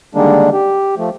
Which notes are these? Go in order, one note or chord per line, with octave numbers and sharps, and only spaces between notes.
D3 D#3 G3 G#3 A#3 D4
G4
F3 A3